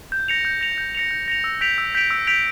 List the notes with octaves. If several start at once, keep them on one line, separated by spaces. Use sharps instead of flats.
G6
A#6 C#7 F7
G6
A#6 C#7 F7
G6
A#6 C#7 F7
G6
A#6 C#7 F7
E6
G6 B6 D7 F7
E6
G6 B6 D7 F7
E6
G6 B6 D7 F7